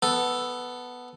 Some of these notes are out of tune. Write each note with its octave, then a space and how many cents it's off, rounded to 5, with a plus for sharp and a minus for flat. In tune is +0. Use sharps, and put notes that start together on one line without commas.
B3 +0 A4 +0